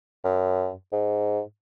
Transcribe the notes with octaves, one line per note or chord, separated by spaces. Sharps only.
F#2
G#2